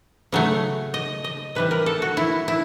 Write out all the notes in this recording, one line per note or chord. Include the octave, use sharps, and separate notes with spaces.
C#3 F#3 A3
D#5
D#5
C3 E3 G3 B4
A#4
A4
F#4
E4
E4